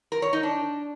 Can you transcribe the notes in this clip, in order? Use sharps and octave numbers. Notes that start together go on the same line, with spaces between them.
A#4
C#5
D#4
D4